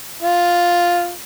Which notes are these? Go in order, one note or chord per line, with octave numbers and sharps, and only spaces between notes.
F4